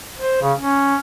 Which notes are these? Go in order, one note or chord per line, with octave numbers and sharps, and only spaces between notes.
C5
C#3
C#4